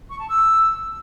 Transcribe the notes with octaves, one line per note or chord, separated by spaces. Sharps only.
C#6
A5
E6